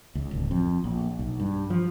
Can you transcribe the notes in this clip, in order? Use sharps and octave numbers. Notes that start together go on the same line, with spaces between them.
C#2
D1
F2
A#1
B1
G2
F3